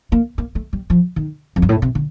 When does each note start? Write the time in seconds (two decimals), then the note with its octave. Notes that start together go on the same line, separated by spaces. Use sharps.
0.12 A#3
0.38 A#3
0.55 A3
0.73 G3
0.90 F3
1.16 D#3
1.56 F2
1.62 G2
1.69 A2
1.82 C3
1.95 D3